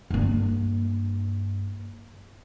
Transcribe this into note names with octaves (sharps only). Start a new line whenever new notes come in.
G2 A#3